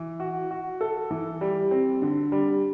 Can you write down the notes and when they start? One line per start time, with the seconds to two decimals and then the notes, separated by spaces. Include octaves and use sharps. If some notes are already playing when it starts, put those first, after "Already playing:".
Already playing: E3
0.20 F#4
0.51 F#4
0.81 A4
1.11 E3
1.41 G3
1.71 C4
2.02 D3
2.32 G3